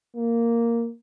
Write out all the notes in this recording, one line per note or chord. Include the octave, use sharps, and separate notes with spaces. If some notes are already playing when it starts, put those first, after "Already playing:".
A#3